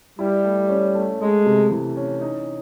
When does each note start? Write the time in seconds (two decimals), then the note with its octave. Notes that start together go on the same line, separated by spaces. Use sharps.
0.19 G3 E4
0.44 A3
0.69 C#4
0.95 A3
1.20 G#3 A3
1.46 C3
1.71 E3
1.97 C#4
2.21 D#4